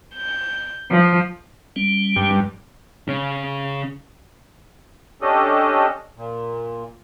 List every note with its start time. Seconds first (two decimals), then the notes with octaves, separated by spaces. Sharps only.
0.14 G6
0.90 F3
1.76 G3 C#4
2.16 G2
3.08 C#3 C#4
5.22 C#4 D4 G4 A4 D#5
6.17 A#2